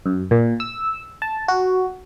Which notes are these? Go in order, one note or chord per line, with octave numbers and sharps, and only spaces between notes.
F#2
A#2
E6
A5
F#4